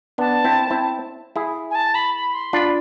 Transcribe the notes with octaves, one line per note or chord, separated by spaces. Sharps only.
B3 D4 A5
C4 E4
C4 E4
E4 G#4
G#5
A5
B5
B5
C6
D4 F4 B5